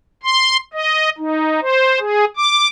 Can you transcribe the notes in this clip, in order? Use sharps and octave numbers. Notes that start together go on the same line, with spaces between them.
C6
D#5
D#4
C5
G#4
D6